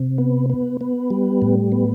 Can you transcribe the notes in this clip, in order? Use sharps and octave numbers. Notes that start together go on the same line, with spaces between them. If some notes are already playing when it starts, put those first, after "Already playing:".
Already playing: C3
B3
B3
B3
G3
A2
B3